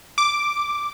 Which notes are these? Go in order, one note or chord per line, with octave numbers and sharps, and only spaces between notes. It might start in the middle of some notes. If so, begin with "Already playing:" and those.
D6